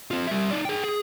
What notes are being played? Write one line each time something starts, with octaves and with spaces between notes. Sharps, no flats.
C4 F4
G3 E5
D#4 D5
G#4 G5
G#4